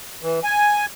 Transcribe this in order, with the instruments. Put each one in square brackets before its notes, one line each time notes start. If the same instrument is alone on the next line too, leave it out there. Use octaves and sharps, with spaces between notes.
[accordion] E3
G#5